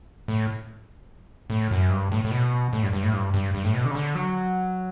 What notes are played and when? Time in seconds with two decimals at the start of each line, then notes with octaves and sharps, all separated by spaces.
0.28 A2
1.50 A2
1.71 F#2
1.90 G2
2.12 A2
2.25 A2
2.31 B2
2.73 A2
2.83 G2
2.93 G2
3.03 A2
3.13 G2
3.34 G2
3.54 G2
3.64 A2
3.74 B2
3.85 D3
3.91 C#3
3.95 D3
4.15 F#3